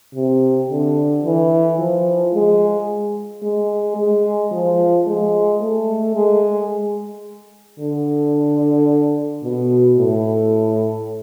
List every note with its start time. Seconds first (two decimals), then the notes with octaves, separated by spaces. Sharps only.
0.15 C3
0.70 D3
1.25 E3
1.79 F3
2.34 G#3
3.43 G#3
3.97 G#3
4.52 F3
5.07 G#3
5.61 A3
6.16 G#3
7.80 D3
9.44 B2
9.98 A2